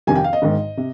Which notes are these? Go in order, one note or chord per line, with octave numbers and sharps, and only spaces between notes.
F2 C3 D#3 G3 G#5
G5
F5
D#5
G#1 G#2 D#3
C3